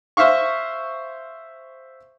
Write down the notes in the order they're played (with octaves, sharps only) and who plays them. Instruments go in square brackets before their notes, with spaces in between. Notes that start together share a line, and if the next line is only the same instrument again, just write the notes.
[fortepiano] C5 E5 F5 C#6